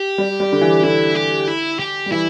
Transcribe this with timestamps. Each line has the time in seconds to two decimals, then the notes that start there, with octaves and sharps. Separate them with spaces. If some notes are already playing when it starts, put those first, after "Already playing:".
Already playing: G4
0.18 G3
0.40 G3
0.52 D3
0.61 E3
0.83 D3 E4
1.15 G4
1.48 E4
1.79 G4
2.06 G3
2.11 E3 E4